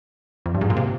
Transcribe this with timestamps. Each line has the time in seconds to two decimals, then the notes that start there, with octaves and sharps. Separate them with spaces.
0.46 F2
0.54 G2
0.61 G#2
0.70 A#2
0.77 C3